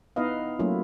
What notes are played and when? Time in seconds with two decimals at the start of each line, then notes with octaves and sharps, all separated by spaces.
0.16 B3 D#4 E4 B4 D#5 F5
0.59 F#3 A3 A#3 C#4 E4 F4